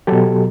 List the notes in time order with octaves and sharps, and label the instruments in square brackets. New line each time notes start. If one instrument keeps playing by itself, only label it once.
[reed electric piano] B2 F#3 G4 A4